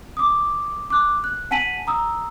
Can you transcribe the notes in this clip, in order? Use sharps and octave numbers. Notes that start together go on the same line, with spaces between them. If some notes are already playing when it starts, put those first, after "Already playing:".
D6 D#6
D6 F#6
F#6
F#5 G#5 A5 B6 D#7 F#7
A#5 D#6 E6